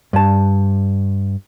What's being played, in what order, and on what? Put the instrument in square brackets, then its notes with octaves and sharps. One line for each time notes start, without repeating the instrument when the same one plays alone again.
[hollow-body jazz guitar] G2 A5